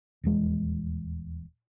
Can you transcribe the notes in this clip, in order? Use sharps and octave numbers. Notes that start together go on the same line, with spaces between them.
D#1 E2 G#3